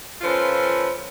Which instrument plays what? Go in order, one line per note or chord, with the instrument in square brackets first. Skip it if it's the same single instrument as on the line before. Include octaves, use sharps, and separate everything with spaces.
[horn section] F3 C#4 F4 A4 B4